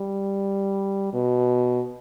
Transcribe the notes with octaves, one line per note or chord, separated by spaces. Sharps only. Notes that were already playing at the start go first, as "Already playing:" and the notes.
Already playing: G3
B2